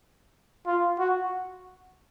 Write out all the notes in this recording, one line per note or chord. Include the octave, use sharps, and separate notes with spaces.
F4
F#4